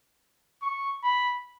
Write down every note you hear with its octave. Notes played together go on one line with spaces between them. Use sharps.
C#6
B5